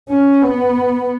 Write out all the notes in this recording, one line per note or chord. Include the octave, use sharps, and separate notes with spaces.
C#4
B3